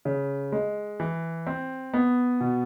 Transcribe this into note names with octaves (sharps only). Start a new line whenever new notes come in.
C#3
G#3
E3
C4
B3
B2